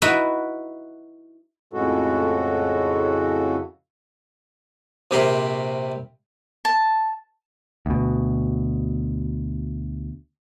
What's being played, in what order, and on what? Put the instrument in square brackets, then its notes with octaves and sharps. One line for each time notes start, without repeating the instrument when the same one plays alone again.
[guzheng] D#4 E4 F#4 B4
[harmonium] F2 A2 C#3 G#3 F#4 A4
[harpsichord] A#1 C3 G4 A#4 B5 C6
[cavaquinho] A5
[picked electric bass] D2 B2